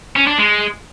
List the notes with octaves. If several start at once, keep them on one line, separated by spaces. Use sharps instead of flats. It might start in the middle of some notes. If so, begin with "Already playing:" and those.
C#4
D4
G#3